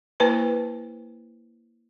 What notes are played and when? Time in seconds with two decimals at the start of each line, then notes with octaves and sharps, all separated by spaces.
0.20 A#3 E4 B4 C5 A5